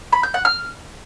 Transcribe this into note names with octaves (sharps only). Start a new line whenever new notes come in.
B5
G6
F#5
F6